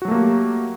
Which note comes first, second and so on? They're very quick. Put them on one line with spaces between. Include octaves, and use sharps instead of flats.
F#4 F#3 A3 A#3 G4